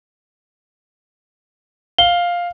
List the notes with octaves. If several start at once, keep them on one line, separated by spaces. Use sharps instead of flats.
F5 G7